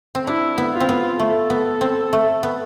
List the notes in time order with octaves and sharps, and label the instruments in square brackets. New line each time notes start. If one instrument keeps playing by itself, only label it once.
[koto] C4
[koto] D4 [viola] E4
[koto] B3
[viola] F4
[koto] C4
B3
[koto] A3 [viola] A4
[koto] B3
C4
A3
B3